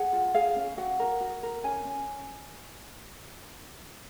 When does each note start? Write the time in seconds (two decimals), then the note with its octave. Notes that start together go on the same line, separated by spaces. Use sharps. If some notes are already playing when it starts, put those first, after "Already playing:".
Already playing: G#4 F#5
0.13 F4
0.34 G#4 F5
0.56 C#4
0.77 F#4 F#5
1.00 A#4
1.21 F#4
1.43 A#4
1.64 C#4 G#5
1.85 C#4